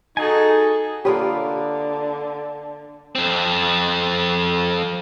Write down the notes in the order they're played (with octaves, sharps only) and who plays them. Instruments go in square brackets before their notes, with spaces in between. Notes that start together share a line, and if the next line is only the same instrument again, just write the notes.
[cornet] D#4 [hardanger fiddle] F#4 A4 [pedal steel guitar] G#4 G#5
[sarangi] D3 [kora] A#3 F4 B4 [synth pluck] G4 C#5 D#6
[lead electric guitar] F2 C4